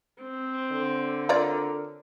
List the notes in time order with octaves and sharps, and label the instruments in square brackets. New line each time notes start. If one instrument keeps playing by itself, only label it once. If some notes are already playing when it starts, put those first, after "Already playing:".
[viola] C4
[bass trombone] D3
[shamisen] F4 C#5 D5 [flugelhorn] A#4